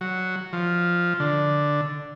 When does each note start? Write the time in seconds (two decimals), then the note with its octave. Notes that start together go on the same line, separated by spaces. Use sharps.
0.01 F#3
0.53 F3
1.20 D3